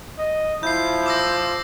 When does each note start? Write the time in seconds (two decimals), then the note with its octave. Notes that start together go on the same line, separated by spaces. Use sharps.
0.19 D#5
0.63 F3 E4 G6 C7
1.06 D6 E6 A#6